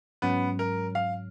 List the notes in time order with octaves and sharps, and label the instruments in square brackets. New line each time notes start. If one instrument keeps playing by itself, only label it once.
[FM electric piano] G#2 F#3 C#4 [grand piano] B3
[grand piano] A#4
F5